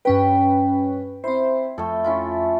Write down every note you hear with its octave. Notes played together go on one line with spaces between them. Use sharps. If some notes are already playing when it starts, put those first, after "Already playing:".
G2 C#4 B4 G5
C4 E4 C5
F2 A3 A4
C#4 E4 F4